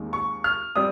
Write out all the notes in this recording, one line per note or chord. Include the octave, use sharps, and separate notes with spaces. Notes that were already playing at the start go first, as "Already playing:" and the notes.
Already playing: D#2 D#3 G#3 C4
C#6
F6
G3 C4 D#6